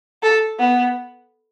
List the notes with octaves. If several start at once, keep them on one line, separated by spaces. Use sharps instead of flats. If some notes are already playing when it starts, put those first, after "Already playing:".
A4
B3